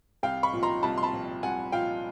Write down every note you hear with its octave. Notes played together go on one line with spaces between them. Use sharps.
C2 F5 G5
B5 C#6
A#2 F3
A#5 C6
C2 A5 B5
C6
A5 B5
A#2 F3
C2 F#5 G#5
A#2 F3 F5 G5